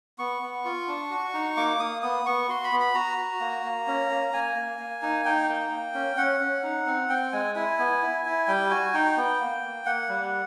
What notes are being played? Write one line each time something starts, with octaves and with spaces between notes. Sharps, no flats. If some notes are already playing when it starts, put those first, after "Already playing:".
B3 C#6
B3
F4
D4
F#4
D#4
A#3 D6
A#3 D#6
B3 D#6
B3 C#6
F#4 C6
B5
B3
B5
F#4 A#5
F#4
A#3
A#3
C#4
A#3
A#3 G#5
A#3
A#3
D#4
D#4 G5
A#3
A#3
C#4
C#4 F#5
C#4
D#4
C4
C4 G5
G#3 G#5
E4 G#5
B3
E4
E4
G3 G5
F#4 G#5
D#4 G5
B3
A#3
A#3
A#3 F#5
G3